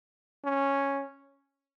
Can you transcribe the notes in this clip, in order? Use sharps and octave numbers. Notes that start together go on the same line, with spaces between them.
C#4